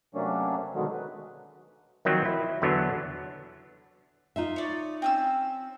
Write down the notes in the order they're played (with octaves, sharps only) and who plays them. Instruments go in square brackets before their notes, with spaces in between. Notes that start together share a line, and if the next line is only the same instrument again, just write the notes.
[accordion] C3 F#3 A3 A#3 C#4 D4
B2 D3 D#3 F#3 G#3 A3
B4
[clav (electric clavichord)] D#3 F3 F#3 C4
E4
E2 D3 F#3 B3 D4
[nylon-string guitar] D#4 F4 E5
[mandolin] C#5 D5
C4 C#4 E6